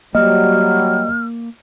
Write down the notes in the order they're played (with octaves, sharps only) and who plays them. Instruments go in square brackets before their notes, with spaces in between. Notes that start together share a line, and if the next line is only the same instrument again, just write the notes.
[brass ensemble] F#3 G3 [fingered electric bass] A#3 [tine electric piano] D#5 [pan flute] F6